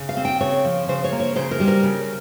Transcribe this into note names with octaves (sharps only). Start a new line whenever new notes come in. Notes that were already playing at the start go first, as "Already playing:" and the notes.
Already playing: C#3
F5
C4
G5
C#3 C#5
F3
C#3 C5
C#5
A#3
C#5
C#3 C5
A#4
G3
A#4
C#3